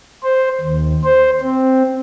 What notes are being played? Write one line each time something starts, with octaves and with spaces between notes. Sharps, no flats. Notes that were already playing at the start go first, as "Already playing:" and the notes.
C5
D#2
C5
C4